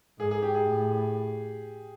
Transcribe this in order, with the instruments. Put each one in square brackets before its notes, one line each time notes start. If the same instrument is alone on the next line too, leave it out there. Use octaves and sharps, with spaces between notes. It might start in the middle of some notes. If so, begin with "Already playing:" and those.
[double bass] G#2 [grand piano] G#4
[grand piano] G#4
G4
G#4
[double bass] A2